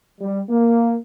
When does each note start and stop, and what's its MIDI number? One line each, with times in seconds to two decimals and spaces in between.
0.21 0.40 55
0.50 0.97 58